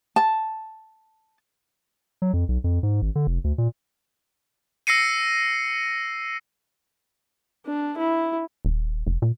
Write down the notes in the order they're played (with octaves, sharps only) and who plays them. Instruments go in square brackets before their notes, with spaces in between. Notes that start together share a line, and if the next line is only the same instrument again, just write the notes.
[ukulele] A5
[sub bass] F#3
F2
B1
F2
G#2
G#1
D3
F1
D2
A#2
[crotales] E6 A#6 C7 C#7 D#7
[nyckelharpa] D4
E4
[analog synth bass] D#1
F1
A#2